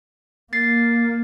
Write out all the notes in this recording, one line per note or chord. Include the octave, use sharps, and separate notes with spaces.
A#3 A6 C7